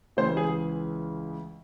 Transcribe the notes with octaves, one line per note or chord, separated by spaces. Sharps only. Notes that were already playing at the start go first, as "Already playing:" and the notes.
C#2 C#3 E3 C5
G#4